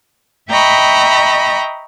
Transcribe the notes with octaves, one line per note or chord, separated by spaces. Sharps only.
D#5 E5 G5 A#5 B5 C#6